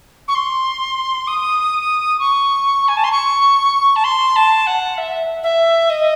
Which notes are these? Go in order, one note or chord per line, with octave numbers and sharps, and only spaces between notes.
C#6
C6
D#6
C#6
G#5
A5
C6
C#6
A5
C6
A5
F#5
E5
E5
D#5